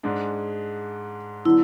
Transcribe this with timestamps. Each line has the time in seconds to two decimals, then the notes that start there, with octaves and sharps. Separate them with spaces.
0.03 G#2 G#3 D4
1.45 D3 F#3 B3 E4